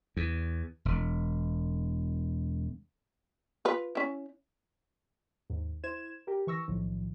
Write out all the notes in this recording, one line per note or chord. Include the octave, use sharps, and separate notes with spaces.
E2
E1
F4 B4
C#4 E4
D#2 G#2
E4 C5 G#6 E7
G4 A#4
E3 C#6 E6 A#6
B1 A2 D#3 F3